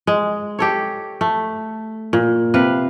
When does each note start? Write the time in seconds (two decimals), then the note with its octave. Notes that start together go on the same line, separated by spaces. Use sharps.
0.07 G#3
0.59 G4 A4 C#5
1.21 A3
2.13 A#2
2.54 C3 B4 F5